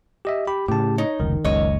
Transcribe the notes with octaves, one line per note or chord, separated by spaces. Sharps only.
G4 D#5 E5
G4 B5
A2 C#3 G4 A5
D#4 C#5
F1 C#2 D#3
F#1 C#2 C#5 D#5